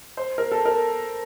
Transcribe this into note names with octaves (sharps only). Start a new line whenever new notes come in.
C5
A#4
A4
A#4